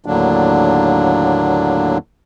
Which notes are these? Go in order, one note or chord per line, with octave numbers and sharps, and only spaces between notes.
D#2 A2 D3 F#3 A#3 D4